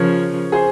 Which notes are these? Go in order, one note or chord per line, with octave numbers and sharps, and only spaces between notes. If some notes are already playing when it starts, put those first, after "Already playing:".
Already playing: C#3 F3 A#4 C#5
G#4 C5